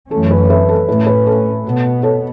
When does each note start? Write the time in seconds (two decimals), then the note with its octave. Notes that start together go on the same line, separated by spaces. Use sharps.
0.11 F#2 E3 A3 C#4 A4
0.31 B4
0.50 B4 E5
0.69 A4
0.88 A2 A3 C#4 B4
1.07 B4
1.26 A4 C#5
1.65 B2 B3
2.03 A4 C#5